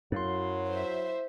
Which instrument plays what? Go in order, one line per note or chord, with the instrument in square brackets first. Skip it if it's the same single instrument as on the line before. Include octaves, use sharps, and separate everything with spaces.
[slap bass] F#2 [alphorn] F#3 [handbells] E4 F5 C6
[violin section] C5 E5